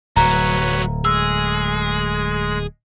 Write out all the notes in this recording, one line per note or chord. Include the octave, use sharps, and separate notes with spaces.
D1 C2 F#3 B4 C#5 A#5
G#3 G#4 E6